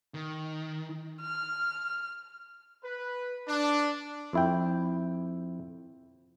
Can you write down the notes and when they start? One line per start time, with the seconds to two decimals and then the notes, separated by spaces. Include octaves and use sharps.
0.14 D#3
1.21 F6
2.83 B4
3.48 D4
4.33 F2 E4 G5